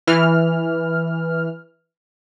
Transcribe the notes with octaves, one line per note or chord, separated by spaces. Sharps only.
E3 F6